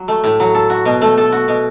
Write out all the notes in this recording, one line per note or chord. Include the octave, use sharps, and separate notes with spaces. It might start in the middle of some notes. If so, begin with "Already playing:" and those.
Already playing: F#3
A3
A2
F#3
A4
F#4
B2
A3
A4
F#4
B2